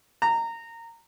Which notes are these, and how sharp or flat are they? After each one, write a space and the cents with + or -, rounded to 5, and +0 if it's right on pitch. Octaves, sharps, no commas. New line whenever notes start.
A#5 -20